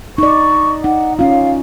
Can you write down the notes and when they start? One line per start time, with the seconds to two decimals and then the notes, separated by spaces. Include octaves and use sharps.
0.18 D#4 D5 C#6
0.84 D#4 F#5
1.19 C#4 F4 F5